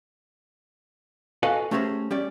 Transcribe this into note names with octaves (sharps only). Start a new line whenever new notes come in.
F#4 A4 B4 D#5 F5 G#5
A3 C#4 G4 G#4 A#4 C5
G3 C#4 G4 D5